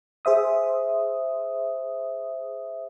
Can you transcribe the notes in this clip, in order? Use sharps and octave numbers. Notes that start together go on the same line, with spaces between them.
G#4 C5 E5 D#6